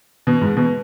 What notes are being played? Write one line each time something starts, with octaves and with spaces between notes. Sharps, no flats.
B2
G#2
B2